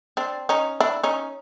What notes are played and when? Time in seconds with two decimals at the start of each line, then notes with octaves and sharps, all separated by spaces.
0.17 C4 D4
0.49 C#4 D#4
0.80 D4 E4
1.03 C#4 D#4